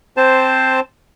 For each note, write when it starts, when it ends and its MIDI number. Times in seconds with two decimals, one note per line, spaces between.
0.17 0.80 60
0.17 0.80 72
0.17 0.80 81